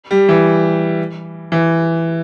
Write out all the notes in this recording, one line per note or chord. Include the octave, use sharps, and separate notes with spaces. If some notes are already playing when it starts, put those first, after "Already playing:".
G3
E3
E3